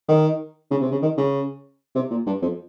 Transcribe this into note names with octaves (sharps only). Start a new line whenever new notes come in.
D#3
C#3
C3
C#3
D#3
C#3
C3
A#2
G2
F2